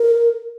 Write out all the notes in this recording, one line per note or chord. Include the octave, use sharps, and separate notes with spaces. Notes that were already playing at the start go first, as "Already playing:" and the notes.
Already playing: A#4